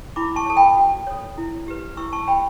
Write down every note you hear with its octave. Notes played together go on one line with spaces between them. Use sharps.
E4 B5 D6
A5 C#6
A4 C#5 A5
G5 B5
F#4
A4 C#5
E4
G4 B4
E4 C#6 E6
A5 C#6
G4 C#5 G5 B5